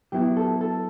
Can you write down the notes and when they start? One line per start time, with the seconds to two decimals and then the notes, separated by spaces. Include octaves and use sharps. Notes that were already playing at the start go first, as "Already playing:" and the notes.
0.12 F#3 B3 E4 G4
0.37 A4
0.61 A4